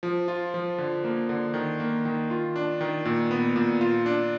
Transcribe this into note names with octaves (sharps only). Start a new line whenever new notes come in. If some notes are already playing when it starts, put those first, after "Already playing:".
F3
F4
F3
D3
A#3
D3
D#3
A#3
D#3
F4
D4
D#3
A#2
B3
A#2
F4
D4